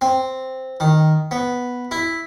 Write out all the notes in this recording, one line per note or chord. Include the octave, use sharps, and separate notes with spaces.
C4
D#3
B3
E4